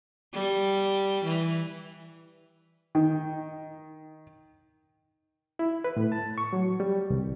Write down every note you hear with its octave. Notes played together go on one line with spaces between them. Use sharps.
G3
E3
D#3
E4
B4
A2
A5
C#6
F#3
G3
C2